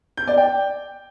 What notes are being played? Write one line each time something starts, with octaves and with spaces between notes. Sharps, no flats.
G6
D5
G5